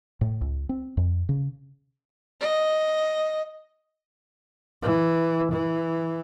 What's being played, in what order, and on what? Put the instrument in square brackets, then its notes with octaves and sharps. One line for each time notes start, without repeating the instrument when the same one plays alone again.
[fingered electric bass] A2
C#2
C4
F2
C#3
[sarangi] D#5
[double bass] E3
E3